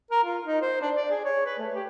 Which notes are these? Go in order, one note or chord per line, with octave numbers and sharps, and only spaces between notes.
A#4
F4
D#4
C5
D4
D5
G#4
C#5
B4
A3
G4